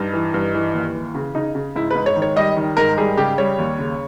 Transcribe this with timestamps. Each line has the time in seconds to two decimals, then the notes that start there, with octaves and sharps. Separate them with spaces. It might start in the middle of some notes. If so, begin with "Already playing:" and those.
Already playing: G2 D#4
0.14 E3
0.34 G2
0.54 E3
0.74 D#2
0.95 E3
1.15 C#3
1.35 C#3 D#4
1.55 C#3
1.76 G#2 E4
1.91 B4
1.96 G#2
2.06 C#5
2.16 D#3
2.22 C#5
2.36 G3 D#5
2.56 D#3
2.77 G#2 A#4
2.98 G3 G#4
3.17 C#3 G4
3.38 G3 C#5
3.58 D#2
3.78 C#3